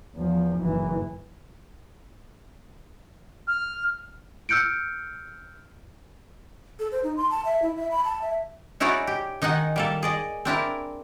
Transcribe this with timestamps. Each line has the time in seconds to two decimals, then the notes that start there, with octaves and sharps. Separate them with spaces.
0.15 E2 F3
0.59 F#1 E3
3.48 F6
4.49 E6 F6 G6 C#7 D7
6.80 A4
6.92 C5
7.04 D#4
7.17 C6
7.31 A5
7.45 E5
7.62 E4
7.76 E5
7.91 B5
8.05 A5
8.22 E5
8.80 D#4 E4 F#4 G#4 C#5 D5
9.07 G4
9.42 D#3 D#4 G#4 F#5 G#5
9.76 G3 A#3 A4
10.03 G#4 D5 D#5
10.45 C4 D4 E4 A#4